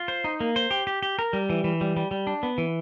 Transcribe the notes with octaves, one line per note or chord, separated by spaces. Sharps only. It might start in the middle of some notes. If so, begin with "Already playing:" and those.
Already playing: F4
C5
D#4
A#3
C5
G4
G4
G4
A#4
G3
E3
E3
G3
G3
G3
D4
B3
E3